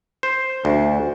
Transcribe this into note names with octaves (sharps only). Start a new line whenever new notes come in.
C5
D2